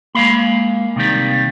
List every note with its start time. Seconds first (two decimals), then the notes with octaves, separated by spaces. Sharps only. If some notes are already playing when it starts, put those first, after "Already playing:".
0.15 G#3 A#3 F5 B5
0.96 C3 D#3 G3